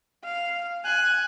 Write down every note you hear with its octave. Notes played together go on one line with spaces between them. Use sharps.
F5
G#5 F#6